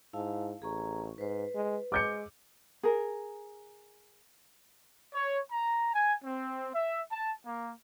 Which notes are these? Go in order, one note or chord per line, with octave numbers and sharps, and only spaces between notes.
G#2 E4 F5 A5
A1 G#4 A#5 C#6
G#2 B4 C5
G#3
G#3 D6 G6 C#7
G#4 A#4
C#5
A#5
G#5
C4
E5
A5
A#3